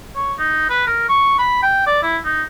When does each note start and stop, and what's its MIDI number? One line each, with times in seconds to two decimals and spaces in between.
0.16 0.33 73
0.39 0.66 63
0.70 0.85 71
0.87 1.06 70
1.09 1.38 85
1.38 1.59 83
1.63 1.83 79
1.87 2.01 74
2.02 2.17 64
2.25 2.43 63